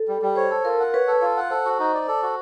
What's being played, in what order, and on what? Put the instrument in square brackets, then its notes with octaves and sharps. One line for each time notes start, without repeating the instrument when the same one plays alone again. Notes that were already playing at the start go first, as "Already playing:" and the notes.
Already playing: [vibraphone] A4
[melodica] G3
G3
[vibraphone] C5 [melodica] C#5
[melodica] A4
[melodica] F4 [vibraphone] A#4
[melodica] F#5
[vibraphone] B4 [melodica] C#5
[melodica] A4
F4
F#5
[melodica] A4 [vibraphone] C5
[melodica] F#4
D#4
D5
A4
F#4